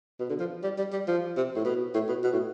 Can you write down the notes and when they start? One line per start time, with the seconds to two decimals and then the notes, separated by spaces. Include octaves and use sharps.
0.20 B2
0.30 D3
0.40 F3
0.64 G3
0.78 G3
0.93 G3
1.08 F3
1.37 C3
1.56 A2
1.65 B2
1.94 A2
2.09 B2
2.24 B2
2.33 A2